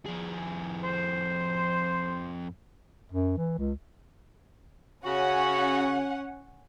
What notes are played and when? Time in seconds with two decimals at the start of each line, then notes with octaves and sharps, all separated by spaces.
0.06 F2 G#4
0.83 C5
3.12 F#2
3.37 E3
3.58 C#2
5.05 C#3 C#4 F#4 F#5